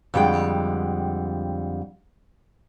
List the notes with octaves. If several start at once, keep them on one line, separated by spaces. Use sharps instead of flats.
F2 D3 G3 G#3 G5